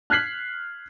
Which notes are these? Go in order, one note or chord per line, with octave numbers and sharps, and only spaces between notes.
F6 F#6 G#6 B6 C7 F#7